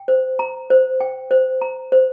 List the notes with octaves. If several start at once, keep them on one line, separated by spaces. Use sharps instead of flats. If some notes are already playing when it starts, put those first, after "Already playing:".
Already playing: G5
C5
A#5
C5
G5
C5
A#5
C5